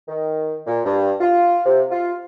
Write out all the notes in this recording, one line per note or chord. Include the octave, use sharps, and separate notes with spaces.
D#3
A#2
G2
F4
C3
F4